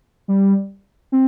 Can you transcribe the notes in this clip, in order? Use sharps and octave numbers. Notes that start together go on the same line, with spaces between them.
G3
C4